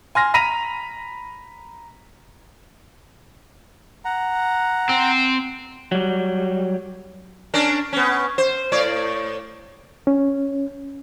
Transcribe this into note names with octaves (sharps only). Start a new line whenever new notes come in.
G#5 C6 F6 A#6
A#5 B5 A#6 B6 D#7 F7
F#5 A#5
C4
F#3 G3
C#4 D4 A#4
B3 C#4
C5
A2 C#5 D5
C#4